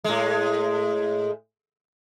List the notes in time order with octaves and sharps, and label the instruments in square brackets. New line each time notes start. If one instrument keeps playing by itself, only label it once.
[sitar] A2 G#3